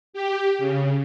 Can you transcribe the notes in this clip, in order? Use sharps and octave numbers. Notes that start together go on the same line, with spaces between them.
G4
C#3